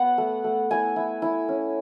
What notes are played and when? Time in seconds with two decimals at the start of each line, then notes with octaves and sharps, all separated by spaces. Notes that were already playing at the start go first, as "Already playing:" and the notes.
Already playing: B3 F#5
0.18 A3
0.44 A3
0.71 E4 G#5
0.96 E4
1.22 E4
1.48 C#4